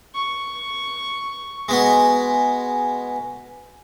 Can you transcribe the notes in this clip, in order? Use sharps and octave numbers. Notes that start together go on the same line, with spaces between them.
C#6
G#3 B3 F#4